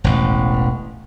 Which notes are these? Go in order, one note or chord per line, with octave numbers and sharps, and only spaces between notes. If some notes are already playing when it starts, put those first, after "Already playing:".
E1 A1